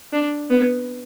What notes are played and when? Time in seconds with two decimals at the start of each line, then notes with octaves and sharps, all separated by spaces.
0.13 D4
0.50 B3